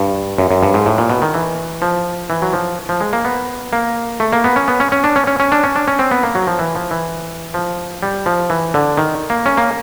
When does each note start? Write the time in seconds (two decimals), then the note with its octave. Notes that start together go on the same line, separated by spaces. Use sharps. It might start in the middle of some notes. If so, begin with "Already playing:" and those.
Already playing: G2
0.38 F#2
0.51 F#2
0.63 G2
0.74 G#2
0.86 A2
0.98 A#2
1.10 B2
1.22 D#3
1.34 E3
1.82 F3
2.30 E3
2.42 F#3
2.53 F3
2.89 F3
3.01 G#3
3.13 A#3
3.25 B3
3.73 A#3
4.20 A3
4.33 A#3
4.44 B3
4.56 C#4
4.68 B3
4.80 C#4
4.92 C#4
5.04 D4
5.16 C#4
5.27 C#4
5.40 C#4
5.52 D4
5.64 C#4
5.76 D4
5.88 C#4
5.99 C4
6.11 B3
6.23 A#3
6.35 F#3
6.47 F3
6.59 E3
6.75 F3
6.91 E3
7.54 F3
8.03 G3
8.26 F3
8.50 E3
8.74 D3
8.97 D#3
9.30 A#3
9.46 C#4
9.57 A#3